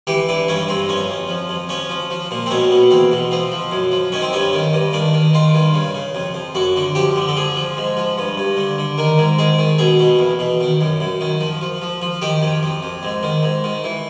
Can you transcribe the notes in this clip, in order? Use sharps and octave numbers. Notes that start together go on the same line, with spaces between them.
E3 G4
E3 D4
G2 C#4
G2 C4
F2 C#4
F2
F3
F2
F3 C#4
F3
F3
A#2
C4
B2 C#4
B2
E2 C4
B2
F3 C4
F3
F#2
F3
D#3 C#4
C4
G2 C#4
D#3
G2
D#3 D4
D#3
D#3 F4
G2
C#3
C#3
F2
F2
F#2 F#4
D3
F3 G4
D3
A4
F3 G#4
F3
G#2
F3
G2
G2
D3
D3
D#3 A#4
G#2
D#3 G#4
D#3
B2 G#4
B2
E2
B2
D#3
F#2
F#2
D#3
F3
F3
F3
F3
D#3 G4
F2
F2
F2
G#2
D#3
G#2
D#3
E3